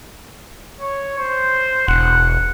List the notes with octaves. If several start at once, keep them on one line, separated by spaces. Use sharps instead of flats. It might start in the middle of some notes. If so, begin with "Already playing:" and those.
C#5
C5
E1 F#5